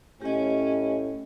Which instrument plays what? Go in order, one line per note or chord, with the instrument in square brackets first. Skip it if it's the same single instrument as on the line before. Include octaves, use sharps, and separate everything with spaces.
[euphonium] A2 [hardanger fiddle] C#4 [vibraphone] G4 D#5